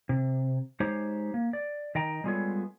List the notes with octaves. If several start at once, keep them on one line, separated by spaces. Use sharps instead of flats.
C3
G#3 D#4 G4 C5 C#5
A#3
D5
D#3 D#5 G5 A#5
G3 G#3 B3 F4 A4 C#5